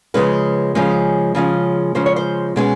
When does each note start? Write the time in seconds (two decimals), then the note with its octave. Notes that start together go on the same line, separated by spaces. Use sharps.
0.14 C#3 F3 G#3 C#4 B4
0.75 C#3 F3 G#3 C#4
1.35 C#3 F3 G#3 C#4
1.95 C#3 F3 G#3 C#4 C5
2.06 C#5
2.16 C5
2.56 B2 G#3 C#4